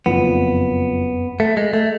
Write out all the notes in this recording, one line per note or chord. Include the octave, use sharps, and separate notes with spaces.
F#1 F2 F3 B3
A3
G#3
A3